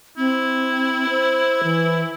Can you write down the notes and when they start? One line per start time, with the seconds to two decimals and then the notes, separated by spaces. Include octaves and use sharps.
0.18 C4 E4
1.09 C5
1.64 E3